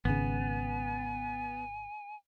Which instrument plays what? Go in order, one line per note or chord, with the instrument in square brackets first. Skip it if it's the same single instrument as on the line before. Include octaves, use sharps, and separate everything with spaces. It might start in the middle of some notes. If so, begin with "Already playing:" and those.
[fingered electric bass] G#1 C#3 [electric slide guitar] B3 [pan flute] G#5